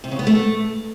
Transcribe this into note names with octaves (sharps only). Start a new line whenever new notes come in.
C3
C#3
B3
A3